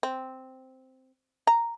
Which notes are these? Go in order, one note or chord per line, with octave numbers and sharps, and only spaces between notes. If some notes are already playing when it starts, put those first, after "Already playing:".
C4
A#5